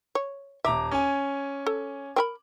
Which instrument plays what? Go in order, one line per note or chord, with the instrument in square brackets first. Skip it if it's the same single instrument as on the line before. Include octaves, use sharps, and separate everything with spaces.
[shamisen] C#5
[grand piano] D#1 A#5 D6 [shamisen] E5
[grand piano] C#4 G#5
[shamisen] A4
C4 A#4 B5